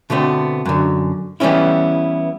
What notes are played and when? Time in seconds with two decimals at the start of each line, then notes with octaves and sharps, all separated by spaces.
0.10 B2 D3 A3 B3 C4
0.66 F#2 D3
1.40 E3 G3 B3 C#4 E4